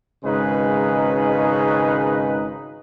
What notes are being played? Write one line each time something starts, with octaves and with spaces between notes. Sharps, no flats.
G#1 C#3 G#3 D#4 B4